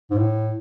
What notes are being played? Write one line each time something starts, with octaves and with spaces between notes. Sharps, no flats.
G#2
A2